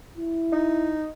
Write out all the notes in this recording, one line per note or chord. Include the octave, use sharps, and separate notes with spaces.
E4
D#4